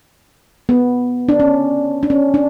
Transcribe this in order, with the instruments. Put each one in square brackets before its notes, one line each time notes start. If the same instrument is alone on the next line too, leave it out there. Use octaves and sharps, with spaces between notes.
[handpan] B3
D4
C#4
D4
C#4
D4